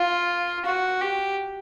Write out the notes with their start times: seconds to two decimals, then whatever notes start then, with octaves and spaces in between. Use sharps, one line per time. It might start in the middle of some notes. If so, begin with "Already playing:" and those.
Already playing: F4
0.65 F#4
1.01 G4